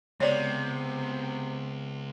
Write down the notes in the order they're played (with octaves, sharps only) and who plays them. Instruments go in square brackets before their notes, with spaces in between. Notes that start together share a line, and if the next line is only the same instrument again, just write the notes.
[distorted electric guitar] C#2 [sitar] C3 [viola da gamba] B3 C4 [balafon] C#5 D5